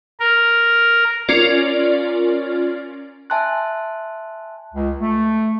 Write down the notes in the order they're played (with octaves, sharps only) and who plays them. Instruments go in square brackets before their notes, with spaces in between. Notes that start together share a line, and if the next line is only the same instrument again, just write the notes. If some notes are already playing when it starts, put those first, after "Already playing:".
[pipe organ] A#4
[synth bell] C#4 F4 A#4 D5
[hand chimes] E5 G#5 A5 C6 F#6
[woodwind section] C#2
A3